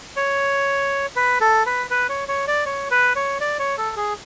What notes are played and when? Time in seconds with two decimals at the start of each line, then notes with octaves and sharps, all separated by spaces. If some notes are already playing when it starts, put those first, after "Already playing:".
0.16 C#5
1.16 B4
1.41 A4
1.66 B4
1.90 B4
2.09 C#5
2.28 C#5
2.48 D5
2.66 C#5
2.91 B4
3.16 C#5
3.41 D5
3.59 C#5
3.78 A4
3.97 G#4